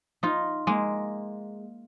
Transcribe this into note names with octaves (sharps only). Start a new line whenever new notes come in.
D#4 F4
G#3 A#3